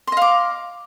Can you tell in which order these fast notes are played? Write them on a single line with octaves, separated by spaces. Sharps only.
C6 D#5 F5 D6